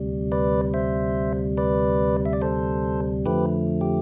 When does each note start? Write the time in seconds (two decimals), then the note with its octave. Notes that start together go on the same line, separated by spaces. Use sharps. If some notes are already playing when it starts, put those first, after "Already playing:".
Already playing: D2 C3 G3
0.32 B4 D5
0.74 C5 E5
1.57 B4 D5
2.25 E5
2.33 D5
2.42 A4 C5
3.26 F2 D3 F3 A3 G4 B4
3.81 G4